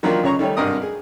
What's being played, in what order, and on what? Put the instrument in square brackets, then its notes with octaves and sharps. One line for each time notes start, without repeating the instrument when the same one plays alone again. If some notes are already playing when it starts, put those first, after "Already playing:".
[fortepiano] D#3 F3 F#3 A#3 D4 F4
C#2 C#3 C#5 A#5 C#6
D#3 G3 A3 C#5
G#1 G2 C3 A#4 D#5 D#6
G#4